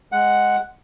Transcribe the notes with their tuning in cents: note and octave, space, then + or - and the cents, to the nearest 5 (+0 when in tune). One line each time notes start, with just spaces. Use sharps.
G#3 +0 F#5 +0